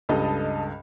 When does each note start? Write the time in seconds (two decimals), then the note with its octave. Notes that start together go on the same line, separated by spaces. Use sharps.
0.09 C#2 G2 A4 D#5 A5